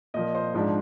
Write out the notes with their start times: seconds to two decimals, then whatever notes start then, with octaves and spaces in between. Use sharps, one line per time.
0.14 A#2 F3 A#3 D#5
0.35 C5
0.54 G#2 F3 G#3 D4